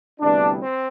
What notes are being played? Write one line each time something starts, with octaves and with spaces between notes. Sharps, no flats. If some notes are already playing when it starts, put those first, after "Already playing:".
D2 C3 E3 G3 B3 D4
C4